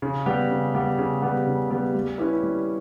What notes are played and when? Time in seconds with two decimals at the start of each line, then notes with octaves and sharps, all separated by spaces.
0.02 C#3
0.26 G3 B3 G4
0.50 C#3
0.75 G3 B3 G4
0.98 C#3
1.22 G3 B3 G4
1.47 C#3
1.70 G3 B3 G4
1.95 G3
2.18 C#4 E4 G4 B4
2.43 G3